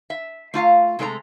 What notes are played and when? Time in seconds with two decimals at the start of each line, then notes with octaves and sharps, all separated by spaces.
0.10 E5
0.54 A3 F4 F5 A#5
0.99 C3 G#3 A3 D5 A#5